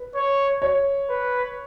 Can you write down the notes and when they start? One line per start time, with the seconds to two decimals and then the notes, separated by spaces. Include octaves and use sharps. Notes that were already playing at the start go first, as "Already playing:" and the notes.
Already playing: B4
0.15 C#5
0.62 C#5
1.09 B4